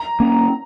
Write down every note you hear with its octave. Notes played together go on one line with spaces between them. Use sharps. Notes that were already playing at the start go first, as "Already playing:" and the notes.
Already playing: A#5
A#3 C#4